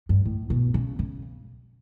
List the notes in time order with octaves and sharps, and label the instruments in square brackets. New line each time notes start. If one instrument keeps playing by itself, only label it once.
[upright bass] G2
A2
B2
C#3
C#3